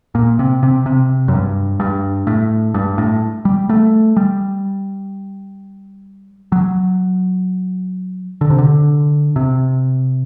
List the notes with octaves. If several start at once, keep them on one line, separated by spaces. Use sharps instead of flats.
A#2
C3
C3
C3
F#2
G2
G2
A2
G2
A2
G3
A3
G3
F#3
D3
C3
D3
C3